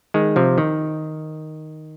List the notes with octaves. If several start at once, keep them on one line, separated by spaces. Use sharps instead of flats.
D#3 G#3
C3 F3
D#3